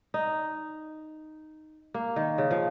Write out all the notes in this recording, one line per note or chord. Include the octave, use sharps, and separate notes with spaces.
D#4
A#3
D#3
C#3
F3